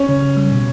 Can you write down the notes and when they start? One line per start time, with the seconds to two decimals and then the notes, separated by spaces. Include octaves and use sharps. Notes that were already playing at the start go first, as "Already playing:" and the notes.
Already playing: C#4
0.09 C#3
0.22 C#3
0.37 G3
0.52 B2